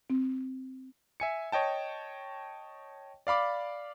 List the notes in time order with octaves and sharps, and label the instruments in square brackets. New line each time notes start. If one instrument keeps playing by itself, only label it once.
[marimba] C4
[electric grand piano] E5 G#5 C#7
C#5 D#5 G5 A5
D5 F5 B5 D6